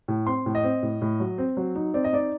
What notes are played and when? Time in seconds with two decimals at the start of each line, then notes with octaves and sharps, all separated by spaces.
0.08 A2
0.27 C4 C6
0.46 A2
0.55 D#5
0.64 C4
0.82 A2
1.02 A2
1.20 F#3
1.38 C4
1.57 F#3
1.76 D#4
1.94 C4 D5
2.04 D#5
2.13 D#4 D5